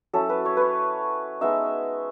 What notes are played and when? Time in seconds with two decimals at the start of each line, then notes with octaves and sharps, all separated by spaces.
0.13 F#3 C#4 E4 A4
0.29 B4
0.45 C#5
0.57 B4 C#5
1.41 G#3 B3 D#4 E5